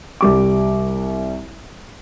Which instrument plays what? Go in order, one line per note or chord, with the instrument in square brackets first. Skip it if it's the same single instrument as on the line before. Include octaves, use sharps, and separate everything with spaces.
[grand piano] C2 G3 D6